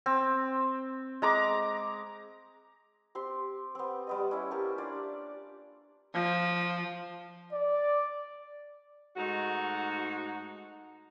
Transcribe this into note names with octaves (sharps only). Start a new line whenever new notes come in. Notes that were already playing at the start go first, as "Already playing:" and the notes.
C4
G#3 A#5 D6
C4 G4 C6
B3 C4
G3 B3 D#5
C#4 E4
A#3 G4 A5
D4 F4 D5
F3
D5
G#2 A3 D#4 F#4